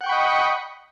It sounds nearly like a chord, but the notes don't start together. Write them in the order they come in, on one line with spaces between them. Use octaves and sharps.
F#5 G5 C#6 B5 D#5